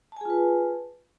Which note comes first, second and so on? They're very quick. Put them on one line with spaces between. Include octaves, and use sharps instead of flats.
A5 G#5 G#4 F4 B4